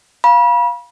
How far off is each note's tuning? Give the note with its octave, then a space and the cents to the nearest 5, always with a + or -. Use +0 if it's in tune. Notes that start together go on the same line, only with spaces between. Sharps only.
F5 +0 B5 -35